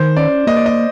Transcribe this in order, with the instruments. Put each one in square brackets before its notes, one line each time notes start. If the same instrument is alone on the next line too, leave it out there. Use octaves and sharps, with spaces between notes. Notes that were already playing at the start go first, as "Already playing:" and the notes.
Already playing: [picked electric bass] D#3 [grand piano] C5
[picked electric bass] C#4 [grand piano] D5
[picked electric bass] A#3 [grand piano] D#5
[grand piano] D5
D#5